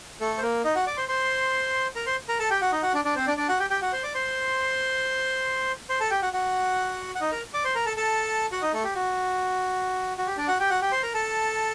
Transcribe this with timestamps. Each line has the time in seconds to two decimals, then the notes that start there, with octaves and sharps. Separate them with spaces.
0.20 A3 A4
0.38 C5
0.42 A#3 A#4
0.64 D#4 D#5
0.75 F#4 F#5
0.86 D5 D6
0.97 C5 C6
1.08 C5 C6
1.96 A#4 A#5
2.06 C5 C6
2.28 A#4 A#5
2.39 A4 A5
2.51 G4 G5
2.61 F#4 F#5
2.72 D#4 D#5
2.83 F#4 F#5
2.94 D4 D5
3.05 D4 D5
3.15 C4 C5
3.27 D4 D5
3.37 D4 D5
3.49 F#4 F#5
3.60 G4 G5
3.70 G4 G5
3.82 F#4 F#5
3.92 C5 C6
4.03 D5 D6
4.14 C5 C6
5.89 C5 C6
6.00 A4 A5
6.11 G4 G5
6.22 F#4 F#5
6.33 F#4 F#5
7.15 F#5
7.21 D#4 D#5
7.32 A#4 A#5
7.54 D5 D6
7.64 C5 C6
7.75 A#4 A#5
7.86 A4 A5
7.97 A4 A5
8.51 F#4 F#5
8.62 D#4 D#5
8.73 A3 A4
8.84 G4
8.95 F#4
10.18 F#4
10.27 G4
10.37 D4 D5
10.48 F#4 F#5
10.60 G4 G5
10.70 F#4 F#5
10.81 G4 G5
10.92 C5 C6
11.03 A#4 A#5
11.14 A4 A5